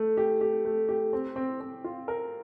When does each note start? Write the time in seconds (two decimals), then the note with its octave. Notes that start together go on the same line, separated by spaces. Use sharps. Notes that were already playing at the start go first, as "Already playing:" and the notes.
Already playing: A3
0.17 G4
0.41 G4
0.65 A3
0.89 G4
1.13 C4
1.36 C4
1.61 C4
1.84 F4
2.08 A#4